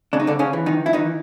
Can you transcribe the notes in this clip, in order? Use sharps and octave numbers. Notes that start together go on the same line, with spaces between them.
C#3 D4
D#4
D3 D4
C#3 C#4
E3
D#3 D#4
E4
D#3 E3 D#4